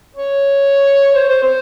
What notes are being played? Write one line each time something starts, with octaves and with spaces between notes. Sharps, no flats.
C#5
C5
C5
C5